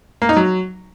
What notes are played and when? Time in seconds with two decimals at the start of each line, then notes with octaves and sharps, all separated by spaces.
0.22 A#3
0.29 D#4
0.37 F#3